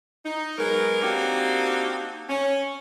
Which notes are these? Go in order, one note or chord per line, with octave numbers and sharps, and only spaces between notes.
D#4
F#3 G#3 B3 A#4
A#3 C4 D4 D#4 F#4 G4
C#4